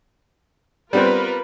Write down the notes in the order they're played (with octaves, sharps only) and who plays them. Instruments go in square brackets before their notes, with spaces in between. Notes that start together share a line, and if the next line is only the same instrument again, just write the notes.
[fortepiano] G3 B3 C4 [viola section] F4 A#4 B4